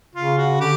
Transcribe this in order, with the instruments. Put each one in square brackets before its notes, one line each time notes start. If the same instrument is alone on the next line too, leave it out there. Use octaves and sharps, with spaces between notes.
[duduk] C#3 [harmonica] F4
[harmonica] F#4
[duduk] D3 [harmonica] G4